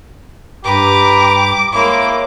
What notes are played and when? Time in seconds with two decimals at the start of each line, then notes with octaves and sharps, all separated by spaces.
0.64 G2 G4 B4 A#5 D6
1.73 G#3 A#3 E4 C#5 D6